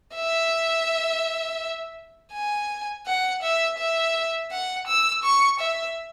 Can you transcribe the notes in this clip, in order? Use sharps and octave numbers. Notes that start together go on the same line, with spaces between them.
E5
G#5
F#5
E5
E5
F#5
E6
C#6
E5